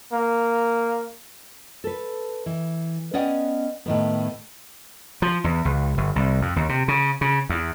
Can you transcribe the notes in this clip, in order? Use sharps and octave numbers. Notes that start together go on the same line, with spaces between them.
A#3
A4 B4
E3
B3 C#4 D5 D#5 F#5 G5
A2 D#3 B3
F3
E2
C#2
G1
C2
F2
D#2
C3
C#3
C#3
E2